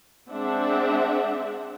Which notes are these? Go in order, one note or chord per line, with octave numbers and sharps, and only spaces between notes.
G#3 C4 D4 E5 F#5